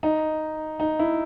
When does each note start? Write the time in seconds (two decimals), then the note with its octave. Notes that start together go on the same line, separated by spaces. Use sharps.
0.03 D#4
0.80 D#4
0.99 E4